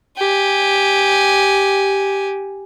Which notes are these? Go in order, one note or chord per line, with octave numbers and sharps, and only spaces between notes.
G4 G#5